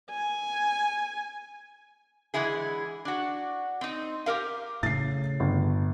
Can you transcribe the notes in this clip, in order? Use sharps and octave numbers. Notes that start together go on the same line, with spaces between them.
G#5
D3 E3 G#3 E4 G#4
D4 F#4
C4 D#4
G4 A4 A#4 F5
A2 C#3 A6 C7
G1